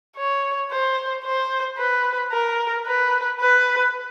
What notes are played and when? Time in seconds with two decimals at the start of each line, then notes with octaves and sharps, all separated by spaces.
0.17 C#5
0.71 C5
1.25 C5
1.78 B4
2.32 A#4
2.87 B4
3.40 B4